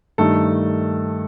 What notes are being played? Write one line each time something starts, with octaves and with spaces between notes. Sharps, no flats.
G2 D#3 A3 A4